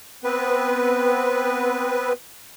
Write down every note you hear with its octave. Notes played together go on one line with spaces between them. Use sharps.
B3 C4 B4